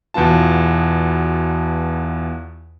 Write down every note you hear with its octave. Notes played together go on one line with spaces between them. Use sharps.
E2 B2 B3 F4 A5